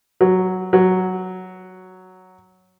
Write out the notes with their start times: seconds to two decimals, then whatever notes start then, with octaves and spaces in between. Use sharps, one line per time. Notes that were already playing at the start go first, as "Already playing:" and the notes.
0.21 F#3
0.73 F#3